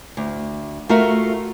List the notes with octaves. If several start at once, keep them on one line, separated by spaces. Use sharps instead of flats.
D2
A3 F4 F#4 A#4 E5 F5